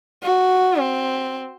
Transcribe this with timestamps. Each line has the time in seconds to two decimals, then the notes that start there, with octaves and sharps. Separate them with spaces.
0.23 F#4
0.79 C4